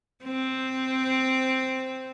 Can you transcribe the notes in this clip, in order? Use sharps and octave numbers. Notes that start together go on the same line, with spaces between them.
C4